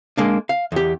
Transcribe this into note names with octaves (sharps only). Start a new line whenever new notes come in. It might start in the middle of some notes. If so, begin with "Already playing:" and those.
G#3 A#3 D4
F5
E2 G4